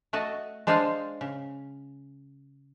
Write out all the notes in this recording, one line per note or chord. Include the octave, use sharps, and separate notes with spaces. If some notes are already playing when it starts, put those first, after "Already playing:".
A3 F#4 D#5 A5
G#3 D4 C5 D#5 F5 A5
C#3